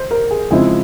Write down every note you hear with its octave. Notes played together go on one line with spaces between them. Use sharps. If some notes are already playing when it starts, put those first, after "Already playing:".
Already playing: C5
A#4
G#4
C#3 F3 G#3 C4 E4 G#4